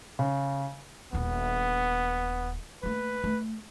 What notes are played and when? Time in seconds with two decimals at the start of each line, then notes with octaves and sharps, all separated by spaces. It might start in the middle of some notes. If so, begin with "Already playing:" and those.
0.19 C#3
1.13 D#1 B3 D4
2.83 A3 A#3 B4
3.24 A3